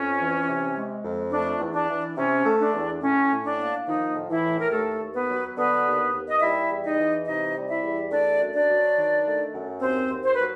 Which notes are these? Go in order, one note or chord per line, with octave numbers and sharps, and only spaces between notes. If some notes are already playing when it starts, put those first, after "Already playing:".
Already playing: F2 C#4
E3
C3
G#3
F2
A3 D4
E2
D4
E3
C3 C#4
A3
D4
E2
A2 C#4
A2
D4
A#3
D#3 F3 D#4
A2
E3 E4
A2
A#4
D#2 A3 A4
D#2
B3 B4
F#3
D3 B3 B4
D#2
D#2
D#5
G3 E4 E5
E2
D#4 D#5
E3
C3 D#4 D#5
G3
E4 E5
E2
A3 D4 D5
F#2
D4 D5
F#3
D#3
A3
F#2
D#2 C4 C5
D#2
C5
F#3 B4